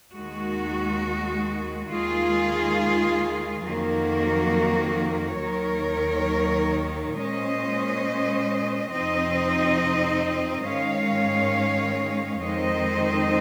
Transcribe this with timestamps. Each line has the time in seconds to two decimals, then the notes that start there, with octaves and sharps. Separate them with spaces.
0.15 D#2 D#3 G#3 F#4
1.91 D#2 D#3 G#3 F4 G#4
3.66 F2 D#3 F#3 A#3 F#4 A#4
5.41 D#2 D#3 F#3 A#4 C#5
7.17 A#2 G#3 C#4 C5 D#5
8.92 F2 C3 F3 C4 D#4 C5 D#5
10.67 G#2 D#3 G#3 C#4 C#5 F5
12.43 F2 D#3 G#3 C4 D#4 C5 D#5